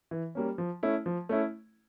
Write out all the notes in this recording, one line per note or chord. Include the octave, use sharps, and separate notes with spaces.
E3
G3 A#3 C#4
F3
A3 C#4 E4
F3
A3 C#4 E4